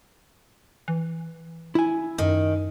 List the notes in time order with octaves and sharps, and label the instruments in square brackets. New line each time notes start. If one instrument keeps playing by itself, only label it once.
[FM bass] E3
[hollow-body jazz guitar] E4 G#5
[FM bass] F#2 [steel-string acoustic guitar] D#3